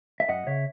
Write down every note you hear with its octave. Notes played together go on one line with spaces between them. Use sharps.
E5
F#2 D#5 F#5
C#3 C#5 E5